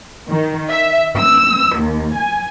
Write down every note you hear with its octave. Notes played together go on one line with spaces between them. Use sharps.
D#3
E5
E6
D#2
G#5